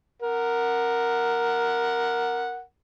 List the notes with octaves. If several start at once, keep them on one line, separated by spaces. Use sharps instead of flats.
A#4 F#5